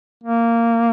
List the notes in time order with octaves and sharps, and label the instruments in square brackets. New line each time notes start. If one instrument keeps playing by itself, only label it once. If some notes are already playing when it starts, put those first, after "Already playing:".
[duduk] A#3